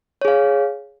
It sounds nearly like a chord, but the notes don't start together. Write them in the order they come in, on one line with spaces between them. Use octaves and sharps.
C#5 G#4 F5